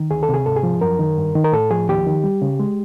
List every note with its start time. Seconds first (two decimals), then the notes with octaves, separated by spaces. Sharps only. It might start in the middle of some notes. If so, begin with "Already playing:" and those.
Already playing: D#3
0.11 D2 G#4
0.23 A4
0.29 C3 G#4
0.46 G#2 A4
0.56 G#4
0.63 F3
0.81 F#2 A#4
0.99 D#3
1.18 G2
1.35 D#3
1.44 A#4
1.52 A2 A4
1.70 F3 G#4
1.89 D#2 G4
2.07 D#3
2.24 G3
2.42 C#3
2.59 G#3